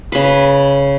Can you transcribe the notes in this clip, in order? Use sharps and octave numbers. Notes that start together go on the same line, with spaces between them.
C#3 B4